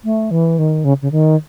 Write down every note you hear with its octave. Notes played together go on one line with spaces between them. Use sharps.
A3
E3
D#3
C#3
C#3
D#3